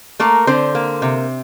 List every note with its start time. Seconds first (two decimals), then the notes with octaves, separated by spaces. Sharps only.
0.20 A3 A#3 A#4
0.47 D3 C4 C5
0.75 A#3
1.02 C3